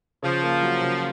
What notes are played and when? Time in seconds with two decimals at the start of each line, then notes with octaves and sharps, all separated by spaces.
0.22 C#3 F3
0.43 A#3
0.62 F#3
0.81 C#3